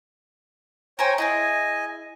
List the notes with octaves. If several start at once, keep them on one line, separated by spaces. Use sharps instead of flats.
A#4 C5 C#5 G5 G#5
E4 F#4 G#4 D#5 G#5